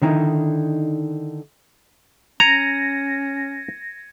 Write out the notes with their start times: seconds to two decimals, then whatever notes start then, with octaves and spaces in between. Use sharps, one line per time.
0.02 D3 D#3 D#4 E4
2.40 C#4 A#5 G#6 A#6 C#7 D#7